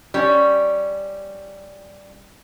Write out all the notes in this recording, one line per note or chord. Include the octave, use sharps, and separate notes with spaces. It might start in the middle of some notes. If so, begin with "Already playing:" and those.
G3 C#4